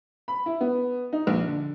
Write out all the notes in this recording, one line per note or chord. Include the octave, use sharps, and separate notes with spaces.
B5
E4
B3
D#4
A#1
D3